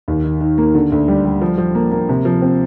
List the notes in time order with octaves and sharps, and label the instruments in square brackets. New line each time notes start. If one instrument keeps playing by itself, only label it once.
[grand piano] D#2
D#3
D#3
A#3
D3
D2
G3
G3
F3
F3
A#3
A#3
C3
F3
C4